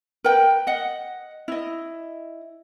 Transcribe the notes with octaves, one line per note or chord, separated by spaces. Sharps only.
A#4 B4 G5
D#5 F#5
E4 D#5